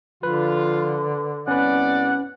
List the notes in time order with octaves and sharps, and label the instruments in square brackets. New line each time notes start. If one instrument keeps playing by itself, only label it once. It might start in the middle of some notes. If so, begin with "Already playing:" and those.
[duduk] D3 [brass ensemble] F3 F4 [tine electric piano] B4
[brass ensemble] C2 B3 D5 [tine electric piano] C#4 B4 [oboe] F#5